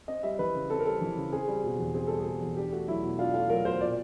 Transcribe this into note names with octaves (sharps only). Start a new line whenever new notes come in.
C4 D#5
G3 E5
E3 B4
C#3
C4 A4
A#4
G3 A4
E3
C#3
C4 G#4
G3
B2
E2
C4 G#4
G3 A4
G#4
B2
E2
D4 G4
A3 F#4
F#3 E4
B2
D4 F4
A3 F4
F#3 A#4
B2 C5
A#2 D5